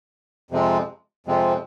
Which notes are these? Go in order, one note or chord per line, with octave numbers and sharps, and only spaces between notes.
F2 C3 F3 G#3 C4
F2 C3 F3 G#3 C4